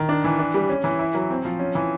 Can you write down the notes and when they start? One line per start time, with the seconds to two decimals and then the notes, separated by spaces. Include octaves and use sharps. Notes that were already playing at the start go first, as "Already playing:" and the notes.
Already playing: D#3
0.09 D4
0.24 E3
0.39 D4
0.54 G3
0.69 C#4
0.84 E3
0.99 E4
1.15 F#3
1.30 C4
1.45 F3
1.59 C#4
1.75 E3